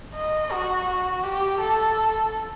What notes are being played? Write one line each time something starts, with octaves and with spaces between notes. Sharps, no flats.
D#5
F#4
F#4
G4
A4